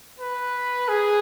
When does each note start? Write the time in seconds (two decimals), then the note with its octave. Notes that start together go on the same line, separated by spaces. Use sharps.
0.20 B4
0.89 G#4